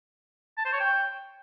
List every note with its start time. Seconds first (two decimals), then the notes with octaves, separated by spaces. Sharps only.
0.58 A5
0.65 C5
0.73 C#5
0.80 G5